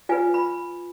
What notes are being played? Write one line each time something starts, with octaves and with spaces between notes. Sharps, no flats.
F4 B4 G#5
B5